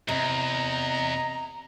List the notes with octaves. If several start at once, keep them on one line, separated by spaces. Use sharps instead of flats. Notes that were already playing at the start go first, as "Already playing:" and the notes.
E2 C3 D#5 A#5